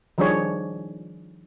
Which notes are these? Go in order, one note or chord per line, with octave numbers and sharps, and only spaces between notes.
D#3 F3 G3 D4 G#4 C#5